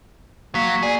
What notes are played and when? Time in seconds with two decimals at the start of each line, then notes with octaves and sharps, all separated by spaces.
0.55 F#3 A#3 C#6 B6
0.83 G#4 D5